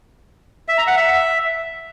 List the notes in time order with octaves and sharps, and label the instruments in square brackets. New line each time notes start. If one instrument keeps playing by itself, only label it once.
[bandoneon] E5
A#5
F#5
E5